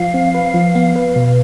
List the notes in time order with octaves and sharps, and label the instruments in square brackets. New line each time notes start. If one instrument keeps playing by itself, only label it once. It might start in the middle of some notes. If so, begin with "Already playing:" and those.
Already playing: [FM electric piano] F3 [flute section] F5
[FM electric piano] C4
B4
F3
B3
B4
B2